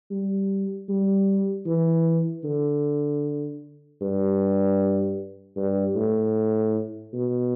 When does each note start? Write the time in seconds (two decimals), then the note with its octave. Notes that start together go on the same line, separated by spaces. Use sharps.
0.11 G3
0.89 G3
1.67 E3
2.45 D3
4.01 G2
5.57 G2
5.96 A2
7.13 B2